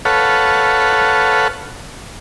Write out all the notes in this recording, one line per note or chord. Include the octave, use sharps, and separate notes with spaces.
A4 B4 C#5 F5 F#5